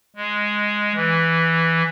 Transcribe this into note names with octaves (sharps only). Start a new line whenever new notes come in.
G#3
E3